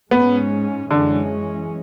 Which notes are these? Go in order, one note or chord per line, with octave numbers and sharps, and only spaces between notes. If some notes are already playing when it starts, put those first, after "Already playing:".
G#2 G#3 B3 C#4
F#2 D3 E3 G#3 C#4